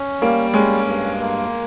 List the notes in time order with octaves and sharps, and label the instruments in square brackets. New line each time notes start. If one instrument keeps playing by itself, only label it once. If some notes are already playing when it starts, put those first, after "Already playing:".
Already playing: [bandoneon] C#4
[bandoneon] G3 [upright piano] A#3
[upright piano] G#3 [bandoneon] C#4
[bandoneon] G2
A#3